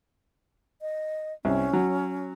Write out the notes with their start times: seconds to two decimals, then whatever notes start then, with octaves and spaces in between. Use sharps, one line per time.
0.82 D#5
1.45 C2 C#4
1.73 F#3